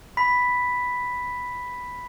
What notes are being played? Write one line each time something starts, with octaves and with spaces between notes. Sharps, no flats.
B5 B6